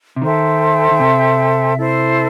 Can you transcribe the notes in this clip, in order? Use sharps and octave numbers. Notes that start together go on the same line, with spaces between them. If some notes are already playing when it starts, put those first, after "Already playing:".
C3
D#3 A4 C5 E5 G5
D#3
C3
E4 A4 C5